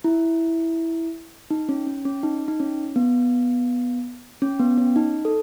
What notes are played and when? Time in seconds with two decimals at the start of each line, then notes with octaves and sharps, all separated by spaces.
0.04 E4
1.51 D#4
1.69 C#4
1.87 C#4
2.05 C#4
2.23 D#4
2.48 D#4
2.60 C#4
2.96 B3
4.42 C#4
4.59 B3
4.78 C#4
4.96 D#4
5.25 A4